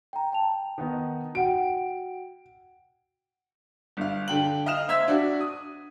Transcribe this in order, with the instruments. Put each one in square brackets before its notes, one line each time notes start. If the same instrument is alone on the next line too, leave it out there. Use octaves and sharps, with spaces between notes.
[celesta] G5 A#5
G5 A5 F7
[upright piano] D#3 B3 D#4
[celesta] F#4 F#5 G5 [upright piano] D7
[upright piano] G1 F5
D3 G5 F#7
D#5 F5 F6 E7 F7
C5 E5 E6 G#6 B6
D4 F#4
D#6